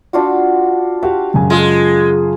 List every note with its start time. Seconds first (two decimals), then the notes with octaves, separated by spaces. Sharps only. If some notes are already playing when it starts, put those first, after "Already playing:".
0.13 D4 F4 F#4
1.03 F#4 G4 F5
1.34 F#2 C#3 G#5
1.50 G#3 F4